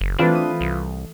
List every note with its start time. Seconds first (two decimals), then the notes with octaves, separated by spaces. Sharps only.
0.01 F#1
0.19 E3 A3 C4 D4 F4 B4
0.35 D#6
0.61 C2